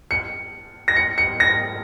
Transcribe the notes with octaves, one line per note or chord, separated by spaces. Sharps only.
C#7
A#6
C#7
C#7
A#6